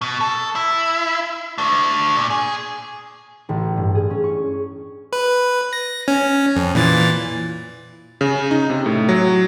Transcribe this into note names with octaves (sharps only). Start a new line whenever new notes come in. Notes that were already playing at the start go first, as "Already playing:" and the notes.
B2
A4
E4
A3 D4
A#2
G#4
A1
G2
G#4
C#4
C#6
B4
A#6
C#4
F2
A#2 E3 A6
C#3
D#4
C3
A2
F#3